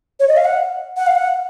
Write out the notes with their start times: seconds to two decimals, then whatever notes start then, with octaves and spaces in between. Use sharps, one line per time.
0.20 C#5
0.29 D#5
0.37 F5
0.45 F#5
0.97 F#5
1.07 F5
1.15 F#5